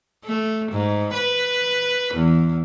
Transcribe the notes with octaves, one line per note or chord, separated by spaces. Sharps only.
A3
G#2
B4
E2